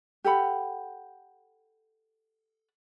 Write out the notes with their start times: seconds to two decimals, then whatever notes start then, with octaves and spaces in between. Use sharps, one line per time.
0.24 G4 A4 F#5 B5